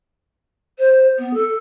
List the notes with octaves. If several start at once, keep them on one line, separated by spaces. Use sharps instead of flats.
C5
B3
A4